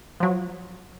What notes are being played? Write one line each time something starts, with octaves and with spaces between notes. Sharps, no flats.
F3 F#3